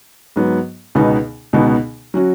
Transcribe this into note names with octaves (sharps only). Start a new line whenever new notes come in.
G#2 F#3 B3
C#2 B2 B3 D#4
C#2 B2 B3 D#4
F#3 C#4 F#4